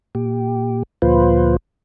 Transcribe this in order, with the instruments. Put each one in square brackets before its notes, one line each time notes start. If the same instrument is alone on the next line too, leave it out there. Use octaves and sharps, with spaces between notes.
[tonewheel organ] A#2 G4
D2 A#2 F3 F4 B4 C5